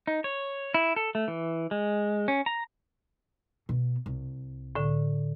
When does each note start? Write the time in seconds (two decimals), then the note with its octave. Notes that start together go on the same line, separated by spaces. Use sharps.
0.07 D#4
0.24 C#5
0.74 E4
0.96 A4
1.15 A3
1.28 E3
1.71 G#3
2.28 C#4
2.46 A#5
3.69 B2
4.06 C2
4.75 A2 D3